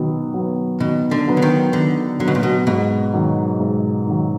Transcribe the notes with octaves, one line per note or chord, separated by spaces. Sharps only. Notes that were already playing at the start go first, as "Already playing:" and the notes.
Already playing: B2 D#3 F#3 B3
F#3 B3
B2 D#3
D3
F#3 B3
D3
D#3
D3 D#3
D3 F#3
B2 B3
A#2
B2
G#2 B2
D#3 F#3
G#2
D#3 F#3